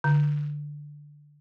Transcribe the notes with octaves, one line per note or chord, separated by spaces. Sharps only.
D3